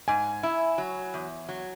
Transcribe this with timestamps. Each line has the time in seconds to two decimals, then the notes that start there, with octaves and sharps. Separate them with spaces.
0.08 G#2 G#5
0.43 E4
0.78 F#3
1.14 E2
1.49 F#3